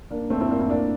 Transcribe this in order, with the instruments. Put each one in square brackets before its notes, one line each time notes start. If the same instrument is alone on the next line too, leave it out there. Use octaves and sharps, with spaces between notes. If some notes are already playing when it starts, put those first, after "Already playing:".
[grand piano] A#3 D4
A3 C4
C4 E4
A#3 D4
C4 E4
A#3 D4